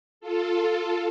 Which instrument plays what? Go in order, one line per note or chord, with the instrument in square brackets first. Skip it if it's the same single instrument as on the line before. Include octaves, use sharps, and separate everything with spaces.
[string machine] F4 A4